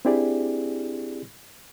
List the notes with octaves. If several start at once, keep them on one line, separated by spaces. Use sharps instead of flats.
C4 D4 E4 G4 G#4 D5